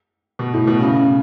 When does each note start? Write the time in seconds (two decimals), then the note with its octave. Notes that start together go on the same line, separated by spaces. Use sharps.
0.39 B2
0.54 A2
0.67 B2
0.81 C#3